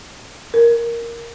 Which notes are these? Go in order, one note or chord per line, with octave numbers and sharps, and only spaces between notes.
A#4